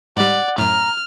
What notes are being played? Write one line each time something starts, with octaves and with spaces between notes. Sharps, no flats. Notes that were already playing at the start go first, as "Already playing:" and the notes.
G#2 G3 D5 F#5
F#2 A2 A#5 F6